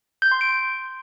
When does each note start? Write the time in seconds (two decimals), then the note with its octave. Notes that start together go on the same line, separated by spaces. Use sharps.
0.22 G6
0.32 C6
0.41 D7